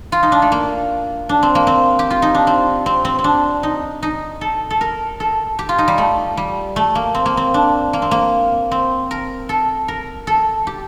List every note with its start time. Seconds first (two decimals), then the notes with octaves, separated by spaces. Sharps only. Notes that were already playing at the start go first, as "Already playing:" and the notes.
0.12 F4
0.23 D#4
0.32 D4
0.42 A3
0.52 A#3
1.29 D4
1.43 C4
1.55 A#3
1.67 C4
1.99 G4
2.10 F4
2.22 D#4
2.35 D4
2.47 C4
2.86 C4
3.05 C4
3.19 C4
3.24 D4
3.63 D#4
4.03 D#4
4.41 A4
4.70 A4
4.81 A#4
5.20 A4
5.59 G4
5.69 F4
5.78 D#4
5.88 G3
5.98 A3
6.37 G3
6.76 A3
6.95 A#3
7.15 C4
7.26 A#3
7.37 C4
7.54 D4
7.93 A#3
8.02 C4
8.11 A#3
8.71 C4
9.11 A#4
9.49 A4
9.88 A#4
10.27 A4
10.67 G4